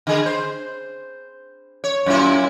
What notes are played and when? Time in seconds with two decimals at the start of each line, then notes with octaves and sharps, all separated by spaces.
0.07 D3 G#4
0.26 C5
1.84 C#5
2.06 F#2 A#2 E4